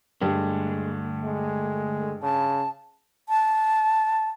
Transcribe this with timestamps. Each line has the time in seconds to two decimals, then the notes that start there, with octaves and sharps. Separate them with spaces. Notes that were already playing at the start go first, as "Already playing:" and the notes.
0.21 G2 D3 G#3 A3
1.24 G#3
2.23 C#3 A5
3.29 A5